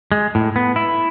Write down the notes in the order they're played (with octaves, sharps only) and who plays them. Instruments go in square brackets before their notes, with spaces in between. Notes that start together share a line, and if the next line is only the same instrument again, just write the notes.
[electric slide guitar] G#3
A2
B3
E4